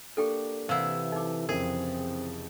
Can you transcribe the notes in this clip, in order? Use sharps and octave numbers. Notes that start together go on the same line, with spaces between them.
A#3 D4 G4 A4 G5 C#6
C3 E3 E4 F5 F#5
D#4 A4 E5 D6
F2 C#3 E3 C4 G#4 A#4